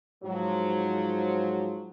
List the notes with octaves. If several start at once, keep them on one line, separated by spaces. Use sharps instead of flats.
G#2 F3 F#3